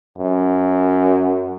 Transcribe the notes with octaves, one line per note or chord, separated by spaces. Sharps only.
F#2